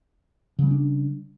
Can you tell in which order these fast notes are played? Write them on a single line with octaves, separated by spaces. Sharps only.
C#3 G3 C4 D4